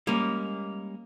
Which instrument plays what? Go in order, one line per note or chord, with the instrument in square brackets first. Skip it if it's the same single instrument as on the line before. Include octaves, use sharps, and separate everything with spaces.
[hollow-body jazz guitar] G3 G#3 C#4 [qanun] A#3